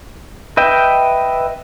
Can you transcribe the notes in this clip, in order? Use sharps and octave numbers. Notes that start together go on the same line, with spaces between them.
B4 D#5 E5 G5